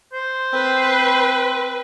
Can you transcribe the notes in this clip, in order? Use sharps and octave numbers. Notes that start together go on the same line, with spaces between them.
C5
C4 B4